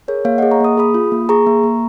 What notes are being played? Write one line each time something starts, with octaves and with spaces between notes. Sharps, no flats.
G#4 A#4 C#5
A#3 C#5 F5
G#4 D#5 F#5
A#5 C#6
A#3 D#6
G#4 B5 D#6
F4
A#3
G#4 A#5 C#6
A#3
A#3